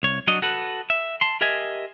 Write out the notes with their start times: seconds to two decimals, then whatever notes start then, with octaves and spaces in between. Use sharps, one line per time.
0.03 C2 C#5
0.27 F#3 D4 F#4 D#5
0.42 F#4 A4 B4
0.90 E5
1.21 A5 C6
1.41 G4 A#4 D#5 E5 G#5